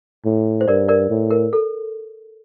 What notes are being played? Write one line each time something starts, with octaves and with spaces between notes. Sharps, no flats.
A2
C5
G2 A#4 D5
A#4 D5
A2
A#4
A4